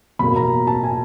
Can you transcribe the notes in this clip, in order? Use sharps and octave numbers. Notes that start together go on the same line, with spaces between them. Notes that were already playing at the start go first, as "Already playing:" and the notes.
F#1 E2 B2 F#3 A#3 B5
A#5
A5
G#5